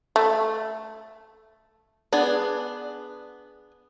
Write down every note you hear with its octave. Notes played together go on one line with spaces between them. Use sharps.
A3
B3 D4 G#4